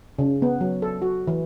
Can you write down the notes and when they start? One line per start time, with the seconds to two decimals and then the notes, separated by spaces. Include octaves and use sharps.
0.19 C#3
0.42 B3
0.61 F#3
0.82 A4
1.02 F#4
1.27 E3